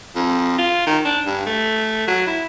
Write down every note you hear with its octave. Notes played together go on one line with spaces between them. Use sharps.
F2
F4
D#3
D4
G2
A3
F#3
E4